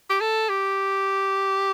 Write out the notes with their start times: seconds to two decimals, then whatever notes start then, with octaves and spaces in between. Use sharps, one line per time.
0.10 G4
0.21 A4
0.49 G4